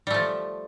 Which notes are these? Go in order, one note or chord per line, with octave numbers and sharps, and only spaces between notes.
F3 G3 A3